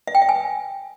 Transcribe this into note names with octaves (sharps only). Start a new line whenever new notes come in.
E5
G5
E5
G#5